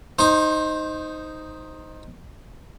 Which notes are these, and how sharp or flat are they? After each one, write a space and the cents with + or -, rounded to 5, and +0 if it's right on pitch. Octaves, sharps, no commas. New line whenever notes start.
D#4 +0 C5 -5 C6 +30